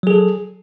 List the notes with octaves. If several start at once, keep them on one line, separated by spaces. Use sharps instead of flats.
F#3 G#4 A4